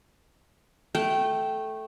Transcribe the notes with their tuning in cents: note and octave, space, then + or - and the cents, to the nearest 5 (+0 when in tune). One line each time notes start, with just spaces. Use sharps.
A3 -5 G5 -15